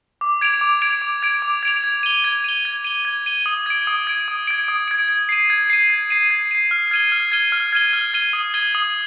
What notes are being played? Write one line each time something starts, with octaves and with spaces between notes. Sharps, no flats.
D6
G#6 D7 F7
D6
G#6 D7 F7
D6
G#6 D7 F7
D6
G#6 D7 F7
G#6
D#7 G7
G#6
D#7 G7
G#6
D#7 G7
G#6
D#7 G7
D#6
G#6 D7
D#6
G#6 D7
D#6
G#6 D7
D#6
G#6 D7
G#6
C7 D#7
G#6
C7 D#7
G#6
C7 D#7
G#6
C7 D#7
F6
G#6 D#7 G7
F6
G#6 D#7 G7
F6
G#6 D#7 G7
F6
G#6 D#7 G7
D#6
G#6 D#7 G7
D#6